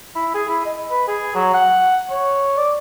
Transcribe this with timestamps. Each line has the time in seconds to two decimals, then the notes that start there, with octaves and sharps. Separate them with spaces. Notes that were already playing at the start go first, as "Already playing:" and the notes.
0.15 E4
0.35 G#4
0.48 E4
0.65 D#5
0.90 B4
1.08 G#4
1.35 F#3
1.54 F#5
2.10 C#5
2.57 D5